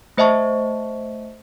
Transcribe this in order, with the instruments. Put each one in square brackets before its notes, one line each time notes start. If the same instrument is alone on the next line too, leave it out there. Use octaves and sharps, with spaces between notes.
[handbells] A3 C5 D#5 E5 A5 C#6